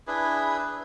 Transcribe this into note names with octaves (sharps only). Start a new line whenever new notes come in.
D4 E4 G#4 B4